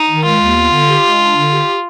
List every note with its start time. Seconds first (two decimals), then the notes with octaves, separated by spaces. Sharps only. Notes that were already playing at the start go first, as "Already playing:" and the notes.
Already playing: D#4
0.09 D#3
0.25 G#3 F4
0.40 D#2
0.56 B3
0.71 D3
0.88 G4
1.04 G#3
1.19 D4
1.35 D3
1.51 G4